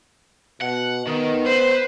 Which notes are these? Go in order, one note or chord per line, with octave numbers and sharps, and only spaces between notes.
B2 F#5
D#3 B3
B4 C5